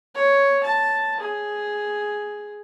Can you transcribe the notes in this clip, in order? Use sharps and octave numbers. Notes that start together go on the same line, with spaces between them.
C#5
A5
G#4